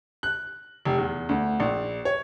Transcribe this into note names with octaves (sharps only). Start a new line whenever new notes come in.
F#6
F1
E2
D2
A#1
C#5